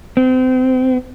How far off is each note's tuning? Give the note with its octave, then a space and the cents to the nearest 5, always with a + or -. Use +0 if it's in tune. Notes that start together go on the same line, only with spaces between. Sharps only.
C4 -30